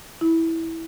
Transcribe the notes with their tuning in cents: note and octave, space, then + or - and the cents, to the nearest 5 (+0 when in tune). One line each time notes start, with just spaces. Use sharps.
E4 -10